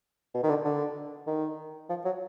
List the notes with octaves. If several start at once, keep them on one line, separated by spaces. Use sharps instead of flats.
B2
D#3
D3
D3
D#3
F3
F#3